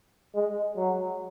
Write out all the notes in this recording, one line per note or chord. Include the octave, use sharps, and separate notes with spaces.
G#3
F#3